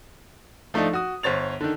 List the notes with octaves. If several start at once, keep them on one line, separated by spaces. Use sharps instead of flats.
F3 A3 D4 D#4
F#4 D#6
G1 C5 C#5 A6 F7
D3 D#3